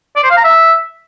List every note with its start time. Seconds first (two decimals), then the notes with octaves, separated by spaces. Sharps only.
0.16 D5
0.23 C5
0.30 F5
0.37 A#5
0.44 E5